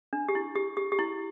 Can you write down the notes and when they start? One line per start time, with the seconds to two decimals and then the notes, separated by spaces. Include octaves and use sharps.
0.13 D4
0.29 G4
0.35 E4
0.56 G4
0.77 G4
0.92 G4
0.99 E4